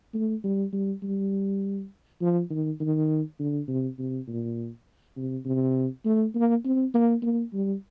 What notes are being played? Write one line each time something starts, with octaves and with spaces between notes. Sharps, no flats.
A3
G3
G3
G3
F3
D#3
D#3
D3
C3
C3
A#2
C3
C3
A3
A#3
C4
A#3
A#3
G3